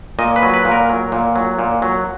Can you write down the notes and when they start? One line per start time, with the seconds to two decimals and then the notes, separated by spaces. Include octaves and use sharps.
0.19 A#2 D#5
0.36 B4
0.43 F#3
0.53 B4
0.65 A#2
0.72 A#4
0.89 F#3
1.12 A#2
1.36 F#3
1.59 A#2
1.82 F#3